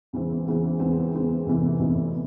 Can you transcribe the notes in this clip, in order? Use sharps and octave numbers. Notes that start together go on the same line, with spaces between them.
E2 C#3 E3 G#3 C4
E2 C#3 E3 G#3 C4
E2 C#3 E3 G#3 C4
E2 C#3 E3 G#3 C4
F1 E2 C3 E3
F1 E2 C3 E3